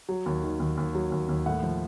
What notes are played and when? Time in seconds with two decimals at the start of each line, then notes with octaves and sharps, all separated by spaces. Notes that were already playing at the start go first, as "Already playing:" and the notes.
0.09 F#3
0.26 D#2
0.43 D#3
0.60 D#2
0.77 D#2
0.95 F#3
1.12 D#2
1.29 D#2
1.46 A2 F#5
1.63 F3